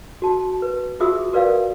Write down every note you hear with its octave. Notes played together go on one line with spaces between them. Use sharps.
F#4 A5
B4
F4 F#4 G#4 E5 D#6 E6
F#4 A#4 B4 D5 E5 F5